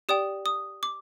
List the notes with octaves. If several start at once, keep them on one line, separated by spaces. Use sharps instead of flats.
G4 D5 G5 D#6
D#6
D6